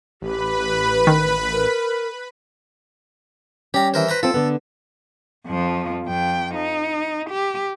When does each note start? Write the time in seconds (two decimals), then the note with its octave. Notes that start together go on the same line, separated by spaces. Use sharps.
0.22 A1 G4 B4 B5
1.07 D#3
1.50 A#4
3.74 G3 C#4 G4 A#5
3.94 E3 A#4 C5
4.09 B4 C5 A#5
4.23 C4 F4 A4
4.34 D3 B3
5.47 F2 F3
6.06 F2 G5
6.55 D#4
7.30 G4